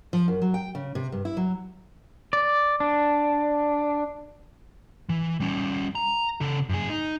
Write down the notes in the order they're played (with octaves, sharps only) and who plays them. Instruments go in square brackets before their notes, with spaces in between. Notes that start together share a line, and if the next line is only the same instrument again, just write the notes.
[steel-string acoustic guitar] F3
F#2
F#3
G5
C#3
C3
G2
E4
F#3
[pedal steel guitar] D5
D4
[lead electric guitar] E3
G3 C#4
A#5
C#3 A4
F#2 G#4
D#4